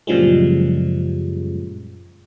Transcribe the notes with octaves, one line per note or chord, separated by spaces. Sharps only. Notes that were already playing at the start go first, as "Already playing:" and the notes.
F#2 A#2 C#3 F3 G3 G#3